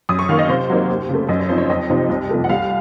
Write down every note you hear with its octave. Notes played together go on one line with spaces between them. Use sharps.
F#2 D#6
C#6
D#3 A#3 F5
D#5
C3 C5
F#3 A#3 D#4
D#2
C#3 A3
F#2 D#5
C#5
F3 C4 D#4 C5
C#5
F2 D#5
C3 F3 C4 D#4
C2
C3 F3 A3
F#5
C2 F5